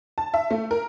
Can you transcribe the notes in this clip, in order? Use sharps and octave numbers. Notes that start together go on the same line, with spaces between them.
A5
E5
A3
A#4